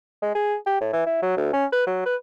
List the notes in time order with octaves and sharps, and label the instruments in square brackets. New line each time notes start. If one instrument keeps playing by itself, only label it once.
[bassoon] G#3
G#4
G4
A2
E3
E4
F#3
D2
C#4
B4
F#3
B4